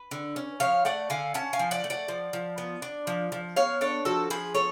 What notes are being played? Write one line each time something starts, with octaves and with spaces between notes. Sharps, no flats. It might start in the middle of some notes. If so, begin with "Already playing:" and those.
Already playing: B4
D3
C#4
F3 C#5 F5
A3 D5 F#5
D3 F5 G#5
C#4 F#5 A5
F5 G#5
F3
D5 F#5
A3
D5 F#5
F3
F3
B3
D4
F3
F3
B3 C#5 F5
D4 A4 C#5
F3 F#4 A4
F3 G#4 B4
B3 A4 C#5